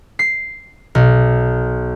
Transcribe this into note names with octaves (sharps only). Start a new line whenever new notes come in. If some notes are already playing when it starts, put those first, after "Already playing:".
C7
B1